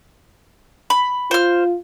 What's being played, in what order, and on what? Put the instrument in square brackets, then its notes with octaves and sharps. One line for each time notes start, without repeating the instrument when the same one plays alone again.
[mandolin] B5
[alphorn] F4 [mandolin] C5 F6